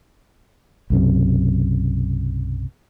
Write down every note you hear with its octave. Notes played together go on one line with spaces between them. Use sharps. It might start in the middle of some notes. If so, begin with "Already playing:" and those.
B1 F#2 C3